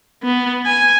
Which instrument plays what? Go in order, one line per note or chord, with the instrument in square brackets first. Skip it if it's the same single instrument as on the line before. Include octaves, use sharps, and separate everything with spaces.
[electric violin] B3
G#5